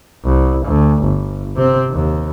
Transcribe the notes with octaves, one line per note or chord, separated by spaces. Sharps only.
C2
D2
G1
C3 C4
D#2